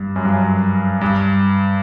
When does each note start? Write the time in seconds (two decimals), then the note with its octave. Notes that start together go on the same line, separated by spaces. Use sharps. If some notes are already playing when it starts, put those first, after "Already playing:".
Already playing: G2
0.16 F#2
0.25 G2
0.33 F#2
1.01 G2